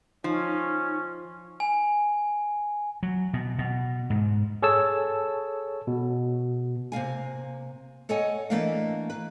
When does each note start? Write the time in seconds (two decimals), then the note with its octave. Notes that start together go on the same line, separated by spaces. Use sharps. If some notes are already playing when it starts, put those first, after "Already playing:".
0.24 F3 C#4 D#4
1.60 G#5
3.03 F#3
3.34 B2
3.59 B2
4.10 G#2
4.62 G#4 A4 C#5 A5 E6
5.87 B2
6.92 C3 A#3 F5 G#5
8.09 A4 C#5 D#5 F#5 G#5
8.50 E3 A3 A#3 D4 D#5 F5
9.10 B4